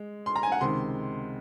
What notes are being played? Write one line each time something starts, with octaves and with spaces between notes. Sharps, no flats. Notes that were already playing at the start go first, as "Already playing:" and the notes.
Already playing: G#3
C6
A#5
G#5
F#5
C#2 C3 D#3 G#3 C6